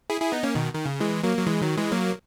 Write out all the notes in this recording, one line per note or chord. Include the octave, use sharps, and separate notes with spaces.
E4 G#4
E4 G#4
B3 D#4
A#3 C#4
B2 D#3
D#3
C#3
E3 G#3
F#3 A#3
F#3
E3 G#3
D#3 F#3
E3 G#3
F#3 A#3